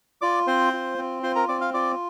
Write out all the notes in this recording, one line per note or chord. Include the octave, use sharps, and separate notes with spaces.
F4 D5 D6
C4 C5 C6
F4
C4
F4 C5 C6
A#4 A#5
C4 D5 D6
F5 F6
F4 D5 D6